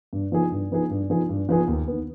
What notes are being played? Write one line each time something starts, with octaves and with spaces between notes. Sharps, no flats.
G2
F3 B3 D#4 G#4
G2
F3 B3 D#4 G#4
G2
F3 B3 D#4 G#4
G2
F3 B3 D#4 G#4
D#2
D#3 B3